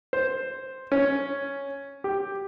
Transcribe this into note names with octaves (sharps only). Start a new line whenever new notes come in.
C5
C#4
G4